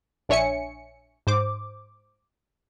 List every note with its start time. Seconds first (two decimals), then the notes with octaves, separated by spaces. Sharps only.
0.29 A#1 D4 C#5 E5 G#5 C#7
1.27 G#2 C5 D6